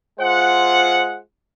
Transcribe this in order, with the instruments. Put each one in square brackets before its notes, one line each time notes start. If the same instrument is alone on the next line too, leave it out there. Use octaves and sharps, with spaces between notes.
[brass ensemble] G#3 F4 C5 F#5